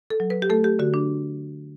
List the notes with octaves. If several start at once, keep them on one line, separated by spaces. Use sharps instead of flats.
A4
F#3
B4
G4
A3 A4
G4
D3 F#4
D4